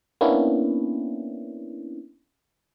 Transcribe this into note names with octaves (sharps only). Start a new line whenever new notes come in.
A#3 B3 C#4 D4 E4